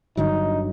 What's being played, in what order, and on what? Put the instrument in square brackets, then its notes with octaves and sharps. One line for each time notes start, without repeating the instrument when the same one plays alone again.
[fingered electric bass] G1 G2 D3 F#3 [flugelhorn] D#4